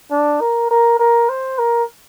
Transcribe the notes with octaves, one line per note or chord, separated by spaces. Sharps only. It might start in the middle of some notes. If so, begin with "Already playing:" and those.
D4
A#4
A#4
A#4
C5
A#4